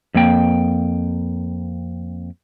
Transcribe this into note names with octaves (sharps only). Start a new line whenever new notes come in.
F2 A#3 G5